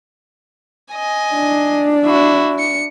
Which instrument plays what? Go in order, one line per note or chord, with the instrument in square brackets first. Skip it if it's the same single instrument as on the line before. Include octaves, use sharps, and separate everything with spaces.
[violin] D#5 G#5
[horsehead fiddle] D4
[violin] E4 F#4
C#7